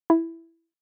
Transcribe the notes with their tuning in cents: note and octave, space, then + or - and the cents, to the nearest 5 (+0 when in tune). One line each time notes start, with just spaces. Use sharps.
E4 +5